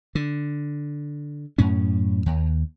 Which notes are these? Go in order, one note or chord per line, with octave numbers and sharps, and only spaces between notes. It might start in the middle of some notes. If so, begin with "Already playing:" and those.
D3
F#2 A2 C#4
D#2